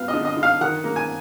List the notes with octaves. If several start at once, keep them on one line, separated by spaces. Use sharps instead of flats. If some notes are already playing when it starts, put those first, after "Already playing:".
Already playing: F#3 B3 F5
D#5
D3
D#5
D3
F5
D#3 F#5
A#3
G#5